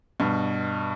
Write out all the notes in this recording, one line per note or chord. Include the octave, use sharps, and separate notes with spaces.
G2 B2